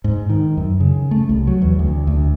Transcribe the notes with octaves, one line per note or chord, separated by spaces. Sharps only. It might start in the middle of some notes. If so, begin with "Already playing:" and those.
G#2
D#3
F#2
C#3
A3
C2
F#3
E2
D2
D2